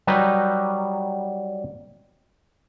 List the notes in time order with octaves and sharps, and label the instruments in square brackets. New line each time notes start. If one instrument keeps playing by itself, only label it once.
[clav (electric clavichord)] F#3 G3 D#4 B4